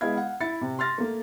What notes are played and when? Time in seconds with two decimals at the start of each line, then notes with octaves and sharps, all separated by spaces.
0.01 G#3 B3 E4 F5 G#6
0.16 F5 F#5
0.40 E4 A6 C#7
0.61 C3
0.79 C6 F6 A6 A#6
0.98 A3 A#3